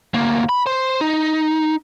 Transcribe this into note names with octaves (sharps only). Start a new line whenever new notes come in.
D2 A#3
B5
C5
D#4